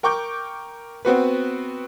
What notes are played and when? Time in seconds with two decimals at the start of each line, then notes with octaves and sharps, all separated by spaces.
0.03 A#4 G5 C#6 D6 G6
1.05 B3 C4 F#4 B4